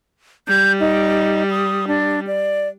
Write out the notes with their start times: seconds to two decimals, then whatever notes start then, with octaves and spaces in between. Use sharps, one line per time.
0.48 G3 G6
0.80 D#4
1.50 D#6
1.87 D4
2.27 D5